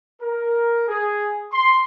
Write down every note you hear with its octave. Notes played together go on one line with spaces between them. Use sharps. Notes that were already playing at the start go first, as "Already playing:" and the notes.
A#4
G#4
C6